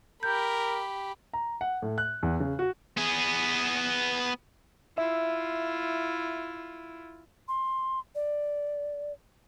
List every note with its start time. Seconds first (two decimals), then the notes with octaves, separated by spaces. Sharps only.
0.23 G4 A#4 B5 G6
1.33 A#5
1.61 F#5
1.82 A2
1.98 F#6
2.23 E2
2.40 C#3
2.59 F#4
2.97 B3 G#4
4.98 E4 F4 E5
7.48 C6
8.15 D5